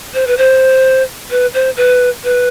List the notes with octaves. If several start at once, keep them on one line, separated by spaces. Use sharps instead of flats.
C5
B4
C5
B4
C5
B4
B4